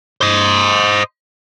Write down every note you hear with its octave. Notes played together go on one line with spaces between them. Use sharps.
C5 D#5